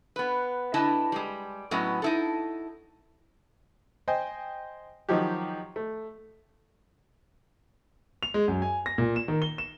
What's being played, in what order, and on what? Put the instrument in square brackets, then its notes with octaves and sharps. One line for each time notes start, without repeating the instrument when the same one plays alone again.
[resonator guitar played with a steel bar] B3 B4
D3 E4 B4 D#5 A5
G3 G#3
A2 F#3 B3 C#4 D#5
D#4 E4 A4
[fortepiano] C5 D#5 G5 G#5
D#3 F3 F#3 D#4 G4
A3
[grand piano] F7
G#3
F#2
G#5
A#6
A#2
E7
D#3
G7
E7